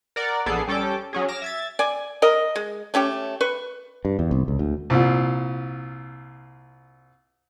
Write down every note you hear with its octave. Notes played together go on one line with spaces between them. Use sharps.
A#4 D5 F#5
A#1 B3 G#4 A4 D5 C7
G3 C#4 A4 G5 D6
F#3 C#4 G#4
D6 F6 A#6 E7
E5 G#6 A6
D5 G#5
A#4 D#5
G#3
A3 C#4 G4 C#5
B4 C#6
G2
E2
C2
C#2
D2
C2 A#2